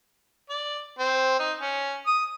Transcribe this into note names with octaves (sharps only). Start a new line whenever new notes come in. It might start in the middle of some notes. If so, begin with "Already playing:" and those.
D5
C4
D#4
C#4
D#6